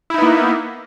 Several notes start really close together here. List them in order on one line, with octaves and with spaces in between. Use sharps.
E4 D#4 B3 A#3